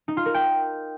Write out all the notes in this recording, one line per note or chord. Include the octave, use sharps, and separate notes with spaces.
D#4
F4
A#4
G5